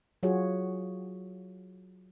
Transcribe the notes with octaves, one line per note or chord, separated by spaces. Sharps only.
F#3 F4 F#4 G#4 C#5